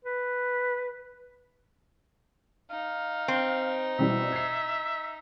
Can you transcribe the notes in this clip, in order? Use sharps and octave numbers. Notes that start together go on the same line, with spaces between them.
B4
D#4 F5
C4
B2 G3 E4 E5
G#6 C7